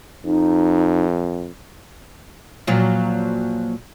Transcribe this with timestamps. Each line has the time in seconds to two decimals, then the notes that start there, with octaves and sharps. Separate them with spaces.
0.24 F2 D#4
2.67 A#2 F3 F#3